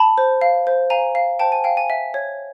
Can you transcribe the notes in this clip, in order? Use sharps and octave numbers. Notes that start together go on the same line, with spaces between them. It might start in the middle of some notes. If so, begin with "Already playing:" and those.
Already playing: A5 B5
C5
F5
C5
F5 G#5 A#5
F5
C5 G5 A5
G#5
F5 G5
G#5
E5
C#5